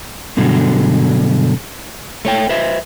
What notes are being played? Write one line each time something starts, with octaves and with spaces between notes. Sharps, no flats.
G2 B2 D3 F#3
A3 C#5 G5
B4 C5 E5